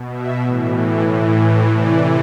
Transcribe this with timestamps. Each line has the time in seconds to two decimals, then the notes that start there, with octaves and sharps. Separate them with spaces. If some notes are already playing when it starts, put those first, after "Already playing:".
Already playing: B2
0.10 E5
0.43 A2 E3
1.07 A2 E3
1.72 C3 E3 D5